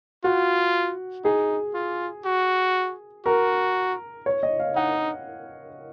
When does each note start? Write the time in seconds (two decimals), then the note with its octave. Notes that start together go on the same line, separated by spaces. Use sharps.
0.24 F4 F#4
1.24 D#4 G#4
1.75 F4
2.25 F#4
3.26 F#4 A#4
4.26 C#5
4.43 D#5
4.60 F5
4.76 D#4 F#5